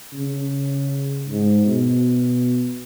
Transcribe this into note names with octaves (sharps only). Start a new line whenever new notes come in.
C#3
G#2
B2